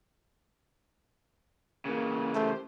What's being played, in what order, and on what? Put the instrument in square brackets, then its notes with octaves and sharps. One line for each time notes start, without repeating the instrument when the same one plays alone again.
[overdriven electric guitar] C#3 E3 [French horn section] A#3
[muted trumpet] A3 [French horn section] G4 A#4 C5